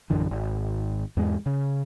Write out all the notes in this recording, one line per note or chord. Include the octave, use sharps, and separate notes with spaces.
A#1 F#2 D3 E3
G#1
E2 G#2 G#3
C#3